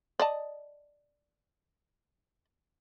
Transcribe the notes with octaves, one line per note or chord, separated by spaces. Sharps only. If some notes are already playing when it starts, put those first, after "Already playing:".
D5 D#5 A5